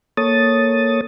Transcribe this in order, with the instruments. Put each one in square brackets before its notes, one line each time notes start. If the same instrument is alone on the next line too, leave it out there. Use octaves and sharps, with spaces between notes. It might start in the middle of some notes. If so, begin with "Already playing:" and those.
[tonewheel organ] A#3 A4 C#5 D#6 A6